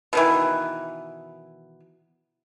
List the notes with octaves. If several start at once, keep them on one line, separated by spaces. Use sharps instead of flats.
B2 D#3 E3